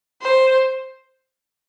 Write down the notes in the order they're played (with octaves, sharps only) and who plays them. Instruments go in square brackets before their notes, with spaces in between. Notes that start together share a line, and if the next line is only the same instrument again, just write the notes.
[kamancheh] C5